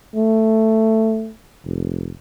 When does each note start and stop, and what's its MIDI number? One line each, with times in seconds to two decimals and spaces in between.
0.15 1.31 57
1.65 2.11 29